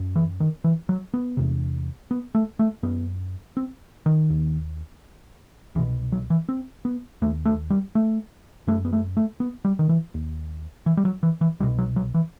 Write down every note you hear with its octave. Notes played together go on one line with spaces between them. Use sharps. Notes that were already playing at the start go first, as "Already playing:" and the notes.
Already playing: F#2
E3
D#3
E3
F#3
B3
E2 C3
B3
A3
A3
F#2 B3
C4
D#3
D#2
C2 B2 E3
F#3
E3
C4
B3
D#2 A3
A3
G3
A3
F#2 A3
B3
A3
A3
B3
G3
D#3
E3
D#2
E3
G3
F#3
E3
E3
C2 B2 G3
F#3
F#3
E3